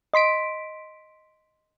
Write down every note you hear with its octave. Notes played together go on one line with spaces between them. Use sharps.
D#5 C6 B6 D7